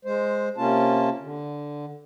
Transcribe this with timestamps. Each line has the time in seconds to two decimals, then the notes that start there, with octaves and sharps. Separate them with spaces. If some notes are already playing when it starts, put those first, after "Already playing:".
0.05 G#3 C5
0.57 C3 A#3 C#4 F4 A5
1.21 D3